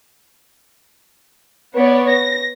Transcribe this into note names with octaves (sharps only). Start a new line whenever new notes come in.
B3 C#5 D5
A#6